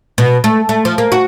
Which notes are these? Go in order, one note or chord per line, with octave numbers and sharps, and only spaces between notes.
B2
A3
A3
F3
A#3
F#4